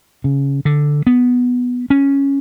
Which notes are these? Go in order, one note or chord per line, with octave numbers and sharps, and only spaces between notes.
C#3
D3
B3
C#4